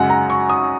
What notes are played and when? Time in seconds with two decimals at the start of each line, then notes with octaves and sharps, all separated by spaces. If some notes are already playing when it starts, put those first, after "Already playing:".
Already playing: F#2 C#3 G#3 F#5
0.10 A#5
0.30 C#6
0.49 D#6